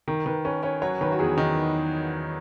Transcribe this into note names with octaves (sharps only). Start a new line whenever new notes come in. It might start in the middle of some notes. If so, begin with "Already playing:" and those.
D#3 A#4
D#3 B4
C#4 B4
C#4 C#5
F#3 C#5
D#3 B4
F#4
E2 G#4
D#3 D#4